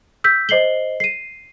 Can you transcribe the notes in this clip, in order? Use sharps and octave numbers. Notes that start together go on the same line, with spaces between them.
E6 G6 B6
C5 D#5 C7 F#7 G7
C7 D#7